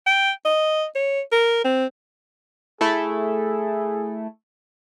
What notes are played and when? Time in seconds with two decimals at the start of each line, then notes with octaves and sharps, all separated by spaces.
0.07 G5
0.46 D#5
0.95 C#5
1.32 A#4
1.64 C4
2.81 A3 E4 G#4 A4